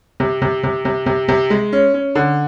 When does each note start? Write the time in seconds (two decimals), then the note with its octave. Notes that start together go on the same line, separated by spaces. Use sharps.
0.20 C3
0.42 C3
0.64 C3
0.85 C3
1.06 C3
1.28 C3
1.50 G#3
1.73 C#4
1.94 C#4
2.15 D3